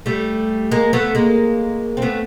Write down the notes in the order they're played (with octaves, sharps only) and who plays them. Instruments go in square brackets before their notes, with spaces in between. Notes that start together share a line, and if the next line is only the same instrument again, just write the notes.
[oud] G3 A3
G#3 A#3
A3 B3
G#3 A#3
C4
A3 B3